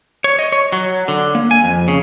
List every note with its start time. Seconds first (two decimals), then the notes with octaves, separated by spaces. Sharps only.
0.24 C#5
0.39 D#5
0.52 C#5
0.72 F#3
1.08 D3
1.35 A#3
1.51 G#5
1.64 F2
1.88 C#3